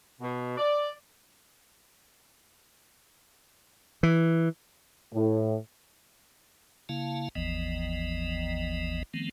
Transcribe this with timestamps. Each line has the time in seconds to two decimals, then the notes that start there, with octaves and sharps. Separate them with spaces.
0.21 B2
0.58 D5
4.03 E3
5.14 A2
6.89 C#3 A#3 E4 F5 A5
7.35 G1 D#2 E3 F3 B3 D#5
9.14 D#3 F3 A3 B3 C4